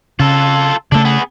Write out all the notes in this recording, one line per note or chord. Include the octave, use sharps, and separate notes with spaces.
C#3 F4 A4
C#3 A3 D4 A4
B3 G#4